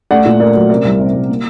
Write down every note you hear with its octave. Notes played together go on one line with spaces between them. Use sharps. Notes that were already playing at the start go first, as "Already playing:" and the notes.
A3 D5 F#5
A#2
A3 A#4 D5
F#3
C3 A#4 D5
C2
C3
C2
A#3